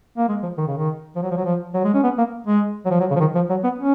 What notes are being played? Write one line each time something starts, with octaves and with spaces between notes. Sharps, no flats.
A#3
G#3
F3
D#3
C#3
D#3
F3
F#3
F3
F#3
F3
F#3
G#3
C#4
B3
A#3
G#3
F#3
F3
F#3
C#3
F3
D#3
F3
F#3
B3
C#4